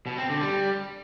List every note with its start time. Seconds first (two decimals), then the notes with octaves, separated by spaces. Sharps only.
0.06 B2
0.18 C4
0.29 D3
0.41 G3